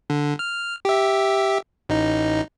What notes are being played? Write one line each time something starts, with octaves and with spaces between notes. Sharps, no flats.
D3
F6
G4 E5
A1 D#4